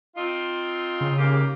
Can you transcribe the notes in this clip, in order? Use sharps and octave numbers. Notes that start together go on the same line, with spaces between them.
C4 D#4 F4
C#3
G#2 A#3 G4